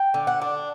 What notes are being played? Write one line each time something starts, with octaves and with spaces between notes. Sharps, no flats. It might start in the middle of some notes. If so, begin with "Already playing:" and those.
Already playing: G5
D3
F#5
D4